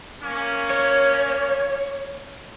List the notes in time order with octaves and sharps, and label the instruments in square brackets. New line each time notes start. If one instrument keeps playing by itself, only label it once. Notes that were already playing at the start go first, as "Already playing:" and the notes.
[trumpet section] A#3 C#4
[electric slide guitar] C#5